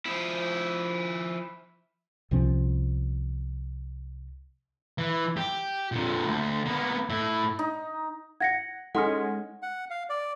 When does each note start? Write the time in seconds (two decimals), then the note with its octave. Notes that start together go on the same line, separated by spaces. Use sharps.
0.06 F3 E4
2.31 C2 C3 F3 C#4
4.98 E3
5.37 G4
5.92 A#2 D3
6.25 D2
6.66 A#3 B3
7.10 A2 E4
7.59 D#4
8.40 F#5 G#6 A#6 C#7
8.95 G#3 C#4 D#4 A4 F#5 G#5 C6 F6
9.63 F#5
9.90 F5
10.09 D5